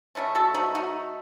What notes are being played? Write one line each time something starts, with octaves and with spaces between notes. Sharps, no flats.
C#3 F#3 A3 C#4
F#4 A4
D#4 F#4
D#4 F#4